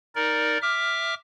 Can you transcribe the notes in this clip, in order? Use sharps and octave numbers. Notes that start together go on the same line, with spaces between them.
D#4 A#4 D5
E5 D6 F6